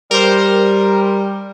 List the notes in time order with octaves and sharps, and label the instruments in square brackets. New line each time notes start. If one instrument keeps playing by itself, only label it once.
[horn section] G3 [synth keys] A#4 C5